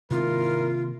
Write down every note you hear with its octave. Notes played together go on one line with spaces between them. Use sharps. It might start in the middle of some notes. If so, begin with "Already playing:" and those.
G#1 C3 D#3 A#3 E4 F4 A#4